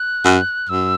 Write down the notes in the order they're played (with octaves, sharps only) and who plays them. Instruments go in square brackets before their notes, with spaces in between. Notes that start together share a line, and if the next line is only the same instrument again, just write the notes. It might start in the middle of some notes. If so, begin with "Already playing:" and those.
Already playing: [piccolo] F#6
[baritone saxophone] F#2
[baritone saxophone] F#2 [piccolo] E6